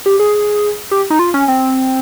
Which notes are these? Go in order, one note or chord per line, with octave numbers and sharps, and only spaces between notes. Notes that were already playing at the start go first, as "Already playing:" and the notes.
G4
G#4
G4
D#4
F4
C#4
C4